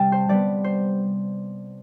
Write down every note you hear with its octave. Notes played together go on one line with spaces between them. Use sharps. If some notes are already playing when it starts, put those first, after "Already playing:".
Already playing: C3 G3 G5 A5
C5
C3 G3 B3 D5
C5